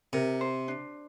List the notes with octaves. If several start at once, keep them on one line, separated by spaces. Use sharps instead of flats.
C3 A#4
C5
D4